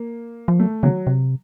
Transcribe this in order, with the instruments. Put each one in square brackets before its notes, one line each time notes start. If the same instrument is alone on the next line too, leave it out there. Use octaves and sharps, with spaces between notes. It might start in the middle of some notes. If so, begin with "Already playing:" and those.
Already playing: [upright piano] A#3
[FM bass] F3
[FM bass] F#3 [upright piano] A3
[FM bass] C#3 [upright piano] F#3
[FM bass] C3